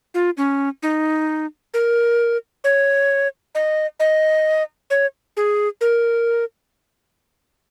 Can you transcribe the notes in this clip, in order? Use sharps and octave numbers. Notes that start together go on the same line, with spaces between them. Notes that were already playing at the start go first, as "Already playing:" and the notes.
F4
C#4
D#4
A#4
C#5
D#5
D#5
C#5
G#4
A#4